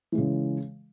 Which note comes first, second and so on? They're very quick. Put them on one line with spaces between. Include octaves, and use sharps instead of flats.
E3 G#3 C#3